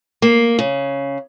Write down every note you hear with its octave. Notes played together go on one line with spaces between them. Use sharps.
A#3
C#3